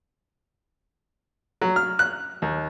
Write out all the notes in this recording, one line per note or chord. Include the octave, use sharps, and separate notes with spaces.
F#3
F6
F#6
D#2